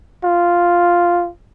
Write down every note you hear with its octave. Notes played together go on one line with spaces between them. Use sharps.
F4